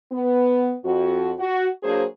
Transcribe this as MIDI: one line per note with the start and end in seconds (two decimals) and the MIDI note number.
0.12 0.73 59
0.84 1.31 41
0.84 1.31 66
1.38 1.67 66
1.82 2.02 54
1.82 2.02 58
1.82 2.02 62
1.82 2.02 68
1.82 2.02 72